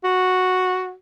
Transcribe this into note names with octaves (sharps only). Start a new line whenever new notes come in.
F#4